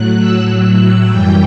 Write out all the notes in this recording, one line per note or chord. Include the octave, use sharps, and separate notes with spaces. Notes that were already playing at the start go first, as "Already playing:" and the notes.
Already playing: A2 F#3 F#6
E6
F#2 E3 G3 G5